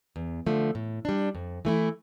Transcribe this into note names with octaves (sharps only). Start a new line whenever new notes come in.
E2
D3 F3 A3
A2
G3 D4
F2
E3 A3 E4